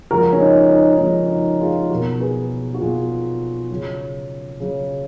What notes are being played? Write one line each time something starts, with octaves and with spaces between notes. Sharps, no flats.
C#3 F3 G#3 F#4 A#4
C#4
D#4
D#4
D#4
C#3 F3 G#3 C#4
D#4
F4 G#4
B2 F#3 F#4 A#4
G#4 B4
F#4
B2 F#3 F4 G#4
C#3 F#3
C#3 F#3